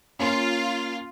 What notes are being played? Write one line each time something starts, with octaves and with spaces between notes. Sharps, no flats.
A#3 C#4 F4